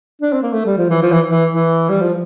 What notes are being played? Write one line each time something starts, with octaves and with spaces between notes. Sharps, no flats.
D4
C4
A#3
A3
G3
F3
E3
F3
E3
E3
E3
G3
F3